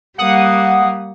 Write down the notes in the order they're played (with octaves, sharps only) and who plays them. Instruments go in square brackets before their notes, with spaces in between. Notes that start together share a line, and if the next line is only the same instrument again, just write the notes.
[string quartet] G3 A#3 [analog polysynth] F#5 D#6